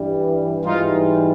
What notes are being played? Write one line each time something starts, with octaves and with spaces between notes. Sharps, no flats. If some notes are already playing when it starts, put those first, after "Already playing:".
Already playing: G2 E3 G3
G#2 E3 G3 D#4 F4